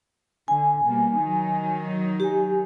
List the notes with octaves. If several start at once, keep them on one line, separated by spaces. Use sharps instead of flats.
D3 G#5
B2 G3 A#3
D#3 F#3 D#4
G4 G#5